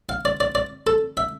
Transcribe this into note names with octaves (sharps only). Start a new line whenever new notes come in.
F5
D5
D5
D5
A4
E5